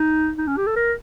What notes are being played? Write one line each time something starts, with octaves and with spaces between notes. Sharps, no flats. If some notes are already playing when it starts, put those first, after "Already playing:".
Already playing: D#4
D#4
C#4
G4
A4
A#4